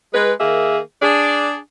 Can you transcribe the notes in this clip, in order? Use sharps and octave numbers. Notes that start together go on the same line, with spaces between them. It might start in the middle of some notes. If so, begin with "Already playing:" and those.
G#3 B4
D#3 A#3 G#4 E5
D4 G#4